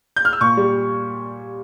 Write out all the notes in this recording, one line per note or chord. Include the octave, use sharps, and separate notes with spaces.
G6
F6
E6
A#2 C#6
G3